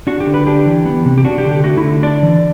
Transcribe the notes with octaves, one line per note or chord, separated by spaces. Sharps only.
D4 F#4
G4
D3
B4
D4 G4
E3
B3
C3
G4
D4 F#4
G4
D3
G4
A3 F#4
E4
D3
D4 D5
E3